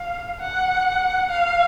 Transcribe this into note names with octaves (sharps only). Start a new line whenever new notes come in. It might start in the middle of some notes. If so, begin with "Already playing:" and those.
Already playing: F5
F#5
F5